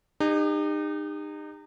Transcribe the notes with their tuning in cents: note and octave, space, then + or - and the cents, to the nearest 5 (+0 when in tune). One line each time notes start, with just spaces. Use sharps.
D#4 -30 G4 +40